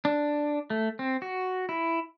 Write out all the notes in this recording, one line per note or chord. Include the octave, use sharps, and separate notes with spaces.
D4
A3
C4
F#4
E4